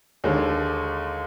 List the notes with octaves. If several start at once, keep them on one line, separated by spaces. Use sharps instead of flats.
D#2 D3 G#3